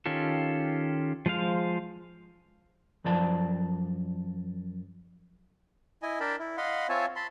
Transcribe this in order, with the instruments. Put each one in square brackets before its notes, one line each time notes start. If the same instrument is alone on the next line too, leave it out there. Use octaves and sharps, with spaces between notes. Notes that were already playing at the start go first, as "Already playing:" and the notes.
[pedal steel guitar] D#3 C#4 F4 G4 A4
F3 G#3 C5 F5
[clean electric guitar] F#2 F3 D5 A5
[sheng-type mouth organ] E4 D#5 G#5
D4 A#4 G5 A5 B5
E4
D#5 F5 F#5 B5 C6
C4 F4 C#5 E5 G#5 A5
A5 B5 C6